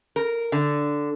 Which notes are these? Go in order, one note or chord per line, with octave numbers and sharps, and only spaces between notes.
A#4
D3